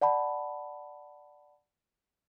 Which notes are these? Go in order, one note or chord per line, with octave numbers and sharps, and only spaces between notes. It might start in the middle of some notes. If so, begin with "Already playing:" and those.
D5 F#5 A5 B5